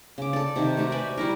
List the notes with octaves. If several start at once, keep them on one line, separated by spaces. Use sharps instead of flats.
C#3 D6
A4 D5
C3 D#3
A3 C4 F#4 G4
B4 D5 E5 G#5
G3 E4 A#4